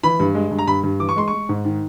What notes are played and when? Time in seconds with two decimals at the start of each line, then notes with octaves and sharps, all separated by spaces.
0.03 E3 B5
0.20 G2
0.35 G#3
0.51 G2
0.59 A#5
0.67 G2 B5
0.84 G2
1.00 E3 D6
1.09 C#6
1.16 G#3 C6
1.28 C#6
1.33 G#3
1.49 G#2
1.65 D#3